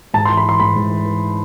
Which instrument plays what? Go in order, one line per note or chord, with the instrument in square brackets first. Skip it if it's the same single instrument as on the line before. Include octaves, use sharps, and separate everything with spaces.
[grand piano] G#2 A5
C6
E3
B5
E3 C6
G#2 B5
G#2
E3
E3